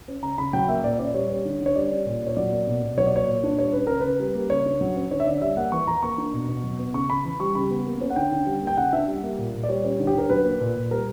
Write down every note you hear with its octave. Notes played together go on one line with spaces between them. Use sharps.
C#4
C#3 A#5
C#3 B5
F#3 G5
A#3 E5
A#2 D5
C#4 D5
G3 C#5
C#4
D3
D3
C#5
G3 D5
C#4
A#2
A#2 C#5
F#3 D5
A#3
B2
B2
F#3 C#5
D5
A#3 C#5
A#2
D4
G3 C#5
C#4 B4
C#3 A#4
C#3 B4
G3
A#3
C#3 C#5
D4
F#3
C#4
D3 C#5
E5
D3 D5
G3 E5
A#3 F#5
E3 C#6
E3 A#5
A#3 C#6
D4
B2
B2
F#3
B3
C#3 C#6
C#3 B5
E3
G3 C#6
C#3 B5
B3
A#3
C#4
F#5
D3 G5
D3
G3
A#3
G5
C#3 F#5
D4 E5
G3
A#3
A#2
A#2
D5
G3 C#5
C#4
D3
G4
D3 A#4
F#3 B4
A#3
A#2
A#2
G3 A#4